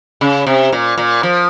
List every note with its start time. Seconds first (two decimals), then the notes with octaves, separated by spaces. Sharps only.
0.21 C#3
0.47 C3
0.72 A#2
0.98 A#2
1.23 F3